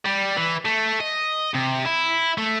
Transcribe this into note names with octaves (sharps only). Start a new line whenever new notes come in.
G3
E3
A3
D#5
C3
E4
A3